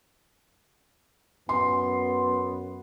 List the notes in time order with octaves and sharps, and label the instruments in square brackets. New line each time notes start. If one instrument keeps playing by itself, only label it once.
[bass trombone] F#2 [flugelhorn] B3 [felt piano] C6